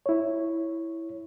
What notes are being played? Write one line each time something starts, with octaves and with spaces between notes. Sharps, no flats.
E4 C#5